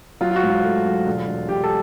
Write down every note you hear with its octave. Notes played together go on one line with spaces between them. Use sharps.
F#3 F4
F4
F#4
G#2
F4
A3
F#3
E1
E1
E1 G4
A4